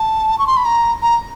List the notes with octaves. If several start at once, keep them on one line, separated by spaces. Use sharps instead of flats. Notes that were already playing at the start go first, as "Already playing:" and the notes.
Already playing: A5
C#6
C6
B5
A#5
A#5